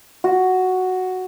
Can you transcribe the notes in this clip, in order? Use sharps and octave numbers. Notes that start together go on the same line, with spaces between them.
F#4